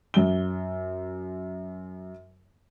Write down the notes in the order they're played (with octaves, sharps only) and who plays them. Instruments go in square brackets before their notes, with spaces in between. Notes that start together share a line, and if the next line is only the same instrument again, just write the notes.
[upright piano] F#2 G7